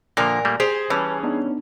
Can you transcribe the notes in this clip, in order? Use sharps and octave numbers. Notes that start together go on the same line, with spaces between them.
A#2 D3 F3 A#3 A#4 D5 A#6
G3 A3 A#3
G4 G#4 C5 G#5 A#5
E3 G3 C#4 B4 C#5 A5
B3 D4 D#4